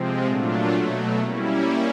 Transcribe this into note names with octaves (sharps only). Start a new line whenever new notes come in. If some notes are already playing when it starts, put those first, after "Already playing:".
Already playing: C3 F3 G#3 C4
A#2 F#3 A3 D4 F4
B2 F#3 A3
G3 A#3 C#4 E4